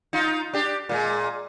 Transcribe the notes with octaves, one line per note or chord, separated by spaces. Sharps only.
D#4 F4
D4 G4
A#2 G#3